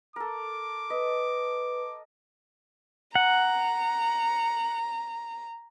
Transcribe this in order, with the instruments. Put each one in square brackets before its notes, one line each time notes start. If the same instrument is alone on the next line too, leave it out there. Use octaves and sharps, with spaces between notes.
[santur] A4 A#4 [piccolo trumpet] D6
[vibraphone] B4 [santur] D#5
[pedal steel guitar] F#5 [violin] A#5